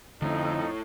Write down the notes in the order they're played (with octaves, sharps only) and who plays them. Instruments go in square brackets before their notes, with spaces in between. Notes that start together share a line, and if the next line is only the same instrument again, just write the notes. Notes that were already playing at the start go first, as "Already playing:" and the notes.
[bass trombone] F2 [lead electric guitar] A2 [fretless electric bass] D3 C#4 [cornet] D#4